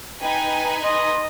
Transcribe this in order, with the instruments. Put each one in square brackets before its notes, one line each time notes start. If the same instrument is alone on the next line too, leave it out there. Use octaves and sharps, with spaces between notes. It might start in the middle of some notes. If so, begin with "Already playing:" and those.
[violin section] D#4 B4 G#5 [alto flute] G5
[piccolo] D#5 [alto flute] C6